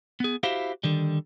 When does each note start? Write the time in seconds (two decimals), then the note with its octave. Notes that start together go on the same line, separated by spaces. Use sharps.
0.20 B3 G#4
0.43 E4 F#4 G4 C5 F5
0.84 D3 D#3 G3